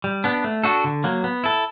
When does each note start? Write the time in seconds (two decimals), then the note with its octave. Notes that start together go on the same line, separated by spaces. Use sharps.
0.04 G3
0.24 B3 D4
0.44 A3
0.64 D4 F#4 A4
0.84 D3
1.04 F#3 A#3
1.24 B3
1.44 E4 A4